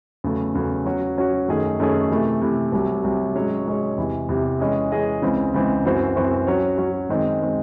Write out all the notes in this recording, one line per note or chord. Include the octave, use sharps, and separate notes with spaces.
E2 C#3 F#3 A3
E2 C#3 F#3 A3
F#3 C#4 F#4
F#3 C#4 F#4
F#2 D#3 A3 C#4 G#4
F#2 D#3 A3 C#4 G#4
C3 E3 A3
C3 E3 A3
C2 C3 F#3
C2 C3 F#3
G#2 F#3 C#4 G#4 C#5
G#2 F#3 C#4 G#4 C#5
E2 C3 E3
E2 C3 E3
E3 G#3 C#4 G#4 D#5
E3 G#3 C#4 G#4 D#5
C#2 C#3 E3 C4
C#2 C#3 E3 C4
F#2 E3 C4 F#4 C5
F#2 E3 C4 F#4 C5
F#3 C#4 F#4 C#5
F#3 C#4 F#4 C#5
F#2 D#3 G#3 C4
D#3 G#3 C4